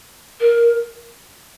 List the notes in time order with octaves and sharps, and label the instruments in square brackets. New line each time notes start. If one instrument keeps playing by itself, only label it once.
[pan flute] A#4